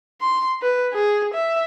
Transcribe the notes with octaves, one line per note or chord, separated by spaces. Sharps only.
C6
B4
G#4
E5